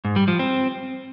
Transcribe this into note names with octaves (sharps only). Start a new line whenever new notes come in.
G#2
G3
F3
C4